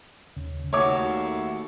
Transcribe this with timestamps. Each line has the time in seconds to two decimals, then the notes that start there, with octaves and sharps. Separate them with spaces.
0.36 D#2 C#3
0.73 D#2 A3 F#4 C#5 E5 D6